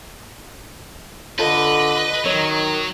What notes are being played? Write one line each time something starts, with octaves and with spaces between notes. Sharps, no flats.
D3 F4 A4 B4 D#5
D#3 F#3 C#5